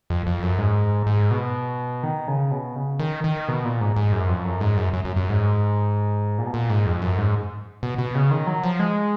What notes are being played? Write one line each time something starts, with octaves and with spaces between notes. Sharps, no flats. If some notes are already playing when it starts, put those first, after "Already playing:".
F2
F2
F#2
G#2
G#2
B2
D#3
C#3
B2
C#3
D#3
D#3
B2
A#2
G#2
G#2
F#2
F2
F#2
G#2
F#2
F#2
F#2
F#2
G#2
A#2
B2
A#2
G#2
F2
F#2
G#2
B2
B2
C#3
D#3
F#3
F3
G#3